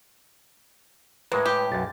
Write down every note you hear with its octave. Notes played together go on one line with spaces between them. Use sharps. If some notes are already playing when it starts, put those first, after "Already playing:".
A2 G#3 A#3 B4 C#5
G4
B1 F#2 A6